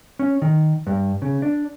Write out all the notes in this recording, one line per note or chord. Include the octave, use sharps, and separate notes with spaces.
C#4
D#3
G2
C#3
D4